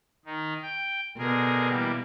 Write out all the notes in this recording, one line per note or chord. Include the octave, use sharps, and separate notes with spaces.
D#3 D#4
G5
B2 D3 G#4 A#4
E3 G3 A#3